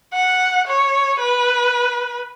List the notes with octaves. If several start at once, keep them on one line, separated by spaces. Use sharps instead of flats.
F#5
C#5
B4